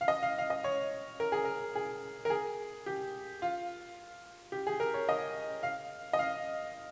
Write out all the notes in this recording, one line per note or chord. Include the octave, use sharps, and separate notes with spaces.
F5
D#5
F5
F5
D#5
C#5
A#4
G#4
A#4
G#4
A#4
G#4
G4
F4
G4
G#4
A#4
C#5
D#5
F5
D#5
F5